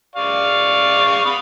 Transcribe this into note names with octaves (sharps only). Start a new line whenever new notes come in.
D5 F5 C#6
B5 D#6